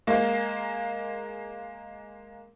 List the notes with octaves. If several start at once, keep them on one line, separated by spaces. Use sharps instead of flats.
G#3 A#3